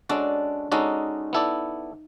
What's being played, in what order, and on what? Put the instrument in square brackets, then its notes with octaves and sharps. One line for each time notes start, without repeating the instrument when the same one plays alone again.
[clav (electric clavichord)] G#3 C#4 F#4 A4 D5 [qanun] D4
[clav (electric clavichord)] G#3 C#4 F#4 A4 D5 [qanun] D#4
[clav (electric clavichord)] B3 E4 A4 D5